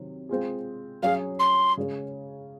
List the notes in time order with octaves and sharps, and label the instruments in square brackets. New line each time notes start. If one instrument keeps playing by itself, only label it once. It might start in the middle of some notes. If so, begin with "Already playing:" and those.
Already playing: [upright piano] C3 D#3 F#3
G#3 C4 F4 G#4
[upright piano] F#3 C#4 G#4 [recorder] F5
[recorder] C6
[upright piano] C#3 G#3 C#4